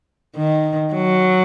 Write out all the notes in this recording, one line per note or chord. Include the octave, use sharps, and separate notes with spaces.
D#3
F#3